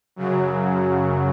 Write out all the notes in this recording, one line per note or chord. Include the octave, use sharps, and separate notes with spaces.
F#2 C#3 F#3